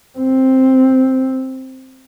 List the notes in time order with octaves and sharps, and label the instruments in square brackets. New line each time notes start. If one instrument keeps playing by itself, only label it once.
[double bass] C4